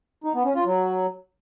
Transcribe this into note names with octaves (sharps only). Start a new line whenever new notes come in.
D#4
B3
C#4
F4
F#3